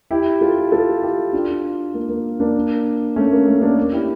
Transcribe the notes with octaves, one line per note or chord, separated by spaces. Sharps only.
E4 G4
F4 A4
F4 A4
E4 G4
D4 F4
A#3
A#3
A#3 D4
A3 C#4
A#3
A3
A#3 D4
E4 G4